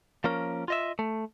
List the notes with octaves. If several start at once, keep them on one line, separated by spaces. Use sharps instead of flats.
F3 A#3 C#4 A#4
F4 D#5 E5
A3